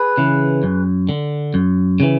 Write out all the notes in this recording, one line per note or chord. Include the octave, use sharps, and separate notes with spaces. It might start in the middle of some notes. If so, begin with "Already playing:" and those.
Already playing: G#4 B4
C#3 E3
F#2
D3
F#2
C#3 E3